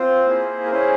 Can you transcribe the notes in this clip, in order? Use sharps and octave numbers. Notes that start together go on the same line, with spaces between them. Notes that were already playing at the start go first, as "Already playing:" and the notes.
Already playing: C4 F4 C5
A#3 E4 G#4
A#4
C#4 E4 G#4 C5